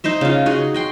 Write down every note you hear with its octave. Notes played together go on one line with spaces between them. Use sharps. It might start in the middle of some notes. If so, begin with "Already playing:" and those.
D#4 C5 D#5 E5
C#3 F4
D#4 F#4 G#4 D#5
D#5 G5 C6